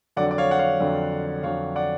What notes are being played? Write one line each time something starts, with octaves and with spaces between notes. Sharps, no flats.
F2 D3 F#3 D5 F#5
D5
C#5 F5
F#5
C#5 F5
F2 D3 F#3
F2 D3 F#3 C#5 F5
D5 F#5